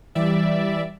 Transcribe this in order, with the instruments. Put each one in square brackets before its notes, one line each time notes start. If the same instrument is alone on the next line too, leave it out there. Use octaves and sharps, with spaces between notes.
[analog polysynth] E3 G3 D5 E5